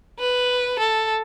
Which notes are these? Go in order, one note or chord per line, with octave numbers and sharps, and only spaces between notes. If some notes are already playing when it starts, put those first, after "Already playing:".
B4
A4